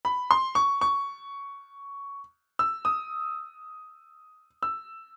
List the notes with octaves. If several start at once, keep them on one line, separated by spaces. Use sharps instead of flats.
B5
C6
C#6
C#6
E6
D#6
E6